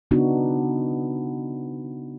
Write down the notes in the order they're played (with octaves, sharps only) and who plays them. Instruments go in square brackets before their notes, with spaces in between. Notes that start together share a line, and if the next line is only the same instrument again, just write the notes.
[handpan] C#3 B3 D4 D#4 F#4